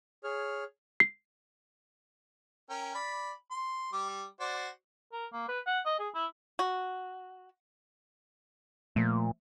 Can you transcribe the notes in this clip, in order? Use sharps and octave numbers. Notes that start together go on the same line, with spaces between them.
G#4 C#5 F6
C7
C#4 A#4 G5
D5 B5
C6
G3 D6
F#4 C5 D5
A#4
A#3
B4
F#5
D#5
G#4
E4
F#4
A#2 F3 A3